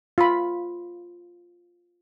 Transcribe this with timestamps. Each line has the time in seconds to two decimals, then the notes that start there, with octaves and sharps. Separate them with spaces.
0.18 F4 B5